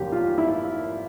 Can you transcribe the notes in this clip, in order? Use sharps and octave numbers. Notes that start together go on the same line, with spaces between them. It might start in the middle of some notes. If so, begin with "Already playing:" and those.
Already playing: F1 D#2 D#3 F#3 G4
F4
E4